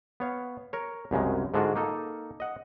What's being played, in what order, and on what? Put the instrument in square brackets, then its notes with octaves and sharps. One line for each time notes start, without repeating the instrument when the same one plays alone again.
[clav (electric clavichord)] B3 C#5 F5
A#4 C#5
C2 F#2 C#3 G#3
G#2 D3 G#3 D4 F4 F#4
A#3 D#4 A4
D#5 F#5